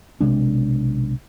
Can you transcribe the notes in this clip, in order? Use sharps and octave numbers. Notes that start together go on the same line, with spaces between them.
B1 C3 G#3 D4